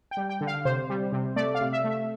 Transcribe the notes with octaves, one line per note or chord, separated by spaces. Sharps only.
G5
G3
G5
D3
F5
C3 C5
G3
C3
A3 D5
F5
C3
E5
A3
E5